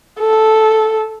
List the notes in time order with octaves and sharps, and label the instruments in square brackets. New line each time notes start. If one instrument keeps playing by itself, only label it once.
[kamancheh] A4